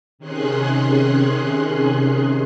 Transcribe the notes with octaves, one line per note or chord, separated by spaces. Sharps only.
C3 D#3 C#4 G#4 C6 F#6